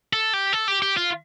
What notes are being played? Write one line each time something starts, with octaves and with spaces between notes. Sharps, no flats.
A4
G4
A4
G4
G4
F4